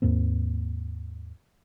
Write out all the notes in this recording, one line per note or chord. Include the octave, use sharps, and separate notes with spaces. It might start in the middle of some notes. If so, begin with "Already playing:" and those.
D#2 G#2 A#3 C4